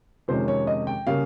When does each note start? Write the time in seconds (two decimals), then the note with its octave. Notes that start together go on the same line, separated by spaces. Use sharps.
0.28 F2 C3 D#3 G#3 C#4 C5
0.48 C#5
0.67 D#5
0.87 G5
1.07 C#3 G3 A#3 C#4 F5